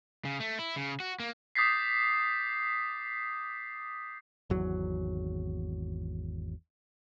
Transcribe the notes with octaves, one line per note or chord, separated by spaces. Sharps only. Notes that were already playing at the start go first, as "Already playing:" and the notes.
C#3
A3
E4
C#3
F#4
A#3
D6 D#6 G6 A6 B6 C7
G#1 E2 F#3